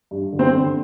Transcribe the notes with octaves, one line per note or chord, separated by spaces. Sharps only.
G2
D3
C4 C5
D3